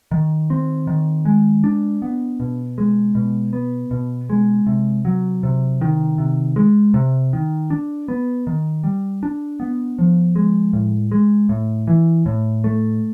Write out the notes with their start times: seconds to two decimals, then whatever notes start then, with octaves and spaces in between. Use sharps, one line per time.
0.11 D#3
0.50 C4
0.87 D#3
1.25 G#3
1.64 D4
2.02 B3
2.40 B2
2.78 G#3
3.15 B2
3.53 B3
3.91 B2
4.30 G#3
4.67 C3
5.05 F#3
5.43 C3
5.81 D#3
6.18 C3
6.56 G#3
6.94 C3
7.33 D#3
7.70 D4
8.08 B3
8.47 D#3
8.84 G3
9.23 D4
9.60 B3
9.99 F3
10.36 G#3
10.73 A2
11.12 G#3
11.49 A2
11.87 E3
12.26 A2
12.64 A3